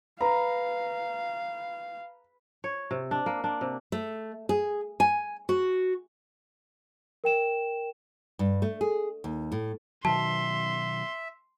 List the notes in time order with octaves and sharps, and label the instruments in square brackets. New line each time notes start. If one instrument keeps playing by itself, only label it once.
[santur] B4 [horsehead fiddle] F5 [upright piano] A#5
[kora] C#5
C3
D4
A#3
D4
C3
[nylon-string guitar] A3
G#4
G#5
F#4
[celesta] A#4 G5 E7
[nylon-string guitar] G2
A3
G#4
D#2
A2
[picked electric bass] B2 D#3 F#3 [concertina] E5 [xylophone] A5 [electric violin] C6